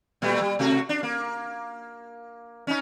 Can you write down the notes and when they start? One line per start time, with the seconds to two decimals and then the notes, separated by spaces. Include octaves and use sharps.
0.22 A#2 G3 A3
0.41 G3
0.59 C3 A3 F#4
0.89 D4
1.03 A#3
2.67 C#4 D#4